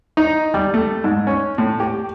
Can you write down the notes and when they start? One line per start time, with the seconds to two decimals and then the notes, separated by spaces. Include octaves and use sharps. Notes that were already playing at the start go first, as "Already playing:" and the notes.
0.17 D#4
0.54 G3
0.74 A3
1.04 G#2
1.27 C#4
1.58 A2
1.80 G4